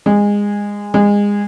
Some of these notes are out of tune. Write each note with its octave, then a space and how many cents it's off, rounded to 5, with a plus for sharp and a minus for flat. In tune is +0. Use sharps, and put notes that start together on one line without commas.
G#3 -20
G#3 -25